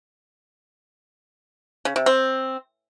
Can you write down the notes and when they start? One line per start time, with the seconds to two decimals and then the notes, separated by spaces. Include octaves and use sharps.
1.85 C#3
1.96 C3
2.06 C4